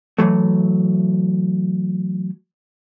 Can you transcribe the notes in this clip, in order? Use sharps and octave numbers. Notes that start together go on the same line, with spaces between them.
E3 F#3 A3